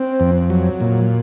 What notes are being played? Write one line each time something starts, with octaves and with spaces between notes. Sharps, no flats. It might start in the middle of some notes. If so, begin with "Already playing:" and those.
Already playing: C4
F2
F#3
A#2